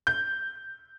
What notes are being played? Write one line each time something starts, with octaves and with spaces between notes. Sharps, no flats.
G6